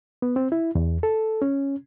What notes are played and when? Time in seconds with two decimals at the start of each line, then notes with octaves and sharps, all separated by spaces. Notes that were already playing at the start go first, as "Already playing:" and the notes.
0.22 B3
0.36 C4
0.52 E4
0.75 E2
1.03 A4
1.42 C#4